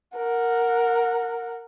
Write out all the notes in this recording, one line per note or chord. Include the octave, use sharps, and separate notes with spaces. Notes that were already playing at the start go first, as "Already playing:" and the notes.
A#4 F#5